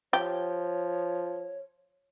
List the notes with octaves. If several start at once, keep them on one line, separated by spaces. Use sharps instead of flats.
F3 G4 C#5